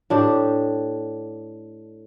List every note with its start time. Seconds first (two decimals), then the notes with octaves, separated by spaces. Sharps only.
0.10 A2 D4 G4